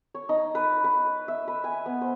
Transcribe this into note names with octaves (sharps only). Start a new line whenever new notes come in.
C#5
D#4
B4
B4
E5
B4
G#5
B3
C5